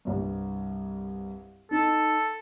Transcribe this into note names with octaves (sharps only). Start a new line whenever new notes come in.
C2 G2
D#4 A4